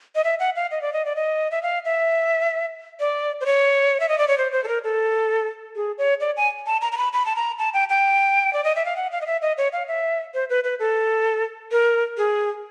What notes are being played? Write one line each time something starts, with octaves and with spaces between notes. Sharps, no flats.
D#5
E5
F#5
F5
D#5
D5
D#5
D5
D#5
E5
F5
E5
D5
C5
C#5
E5
D#5
D5
C#5
C5
C5
A4
A#4
A4
G#4
C#5
D5
G#5
A5
A#5
A#5
B5
B5
A5
A#5
A5
G5
G5
D5
D#5
E5
F5
F#5
F5
D#5
E5
D#5
C#5
F5
E5
C5
B4
B4
A4
A#4
G#4